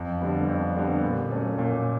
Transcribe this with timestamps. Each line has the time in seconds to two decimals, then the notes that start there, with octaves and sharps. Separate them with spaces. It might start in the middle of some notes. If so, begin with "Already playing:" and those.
Already playing: F2
0.21 D3 G3 B3
0.48 F2
0.76 D3 G3 B3
1.04 A#2
1.31 F#3 A3 C#4
1.58 A#2